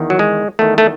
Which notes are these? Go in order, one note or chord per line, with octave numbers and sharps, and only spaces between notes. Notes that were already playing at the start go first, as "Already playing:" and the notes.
Already playing: E2 D#3
F#3
G#3
E2 D#3 A3
A3